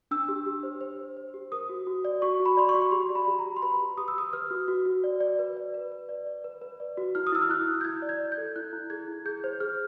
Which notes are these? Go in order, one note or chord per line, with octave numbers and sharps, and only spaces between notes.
D4 E6
G4
G4
C5
C5
C5
C5
G4
A#4 D#6
F#4
F#4
D5
F#4 C#6
F#4
B5
D5 C6
C#6
F#4
G4 C6
D5
B5
G4
A#5
G4
C6
B4 B5
G4
G4 D#6
E6
G4 D#6
B4 F6
F#4
F#4
F#4
D5
D5
B4
D5
B4
B4
D5
D5
B4
B4
D5
F#4
E4 F6
D#6
E4 E6
F6
E4 F#6
E4
G6
E4 G#6
D5
G#6
D5
G6
A4
E4 F#6
E4
G#4 G#6
E4
G#4 G6
C5
G#4 F6